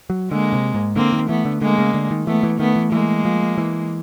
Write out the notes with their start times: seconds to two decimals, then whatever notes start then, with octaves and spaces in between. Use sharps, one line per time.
0.10 F#3
0.31 D3 G#3 A#3
0.53 C3
0.74 G#2
0.96 D3 A#3 C4
1.13 D#3
1.29 E3 A3 B3
1.45 D3
1.61 D3 G#3 A#3
1.78 C#3
1.94 D3
2.11 D#3
2.27 E3 A3 B3
2.43 E3
2.59 D#3 A3 B3
2.76 E3
2.92 E3 G#3 A#3
3.25 F3
3.58 E3